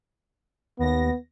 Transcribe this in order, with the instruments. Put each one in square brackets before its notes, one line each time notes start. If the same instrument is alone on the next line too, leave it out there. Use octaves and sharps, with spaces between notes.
[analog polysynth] D#2 A#6 [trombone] B3